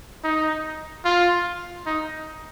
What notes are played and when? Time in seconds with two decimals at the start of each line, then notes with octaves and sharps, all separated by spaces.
0.24 D#4
1.05 F4
1.86 D#4